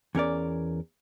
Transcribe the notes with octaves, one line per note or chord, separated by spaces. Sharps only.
E2 C#4 A#4 D5